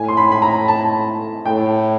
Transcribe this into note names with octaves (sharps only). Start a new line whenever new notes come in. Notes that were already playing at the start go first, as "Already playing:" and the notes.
Already playing: A2 G#5
C6
B5
B5
A#5
A5
A2 G5